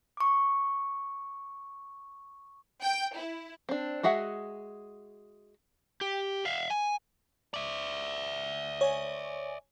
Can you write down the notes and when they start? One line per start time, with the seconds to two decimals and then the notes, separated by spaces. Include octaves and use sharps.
0.17 C#6 D6
2.81 G5
3.15 E4
3.69 C4 D4
4.03 G#3 F#4 G#4 E5 F#5
6.01 G4
6.45 E5 F5
6.70 G#5
7.54 D5 E5
8.81 C#5 G#5